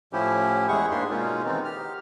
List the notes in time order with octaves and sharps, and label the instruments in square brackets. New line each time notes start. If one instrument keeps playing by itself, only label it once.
[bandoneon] A2 F3 C#4 E4 G4
E2 G#3 E4 G#4 F#5 C#6
G#2 A#3 D4 G4 C6
B2 G#3 A#3 C#4 D#4 F4
D#3 E3 B3 C4 D#4
G4 F6